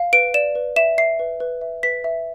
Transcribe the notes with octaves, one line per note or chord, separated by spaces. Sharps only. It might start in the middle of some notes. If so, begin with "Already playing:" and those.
Already playing: F5
B4 D7
D5 E7
B4
E5 E7
E5 C7
B4
B4
E5
B4 B6
E5